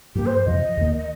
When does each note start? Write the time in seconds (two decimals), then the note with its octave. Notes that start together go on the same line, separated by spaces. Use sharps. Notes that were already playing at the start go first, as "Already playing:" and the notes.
0.15 G2 F3 A#3 G4
0.26 C5
0.45 F2 C3 F3 D#5
0.77 D#2 D#3 A#3